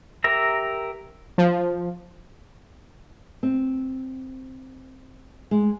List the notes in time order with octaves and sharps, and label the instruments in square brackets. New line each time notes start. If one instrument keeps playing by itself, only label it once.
[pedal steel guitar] G4 A#4 E5 A#5
[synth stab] F3
[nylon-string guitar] C4
G#3